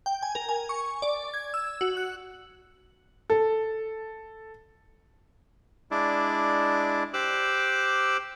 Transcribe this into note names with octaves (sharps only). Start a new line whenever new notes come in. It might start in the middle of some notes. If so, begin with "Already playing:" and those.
G5
G#5
A#4
G#5
C#6
D5
G#6
E6
F#4
F#6
A4
G#3 D4 E4 D5
G4 C5 D6 E6 F#6